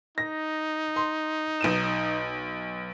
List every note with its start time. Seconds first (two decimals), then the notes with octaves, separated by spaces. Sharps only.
0.18 D#4 A#6
0.96 C6
1.61 B1 D#7 E7